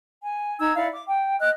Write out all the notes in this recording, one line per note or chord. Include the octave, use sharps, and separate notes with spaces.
G#5
D#4 A#5 E6 G#6
E4 D5 F5 F#5
D6
G5
D#5 F6 F#6